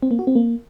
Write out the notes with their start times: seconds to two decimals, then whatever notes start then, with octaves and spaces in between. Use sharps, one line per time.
0.03 C4
0.11 A#3
0.19 F#4
0.27 C4
0.35 A#3